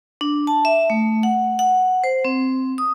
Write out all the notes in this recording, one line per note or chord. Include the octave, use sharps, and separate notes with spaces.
D4
A5
E5
A3
F#5
F#5
C5
C4
D#6